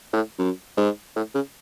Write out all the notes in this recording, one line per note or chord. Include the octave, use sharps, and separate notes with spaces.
A2
F#2
G#2
A2
C#3